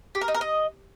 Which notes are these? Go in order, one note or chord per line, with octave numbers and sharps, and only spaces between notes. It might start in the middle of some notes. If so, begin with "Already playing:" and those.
G4
A#4
D#4
A#4
D#5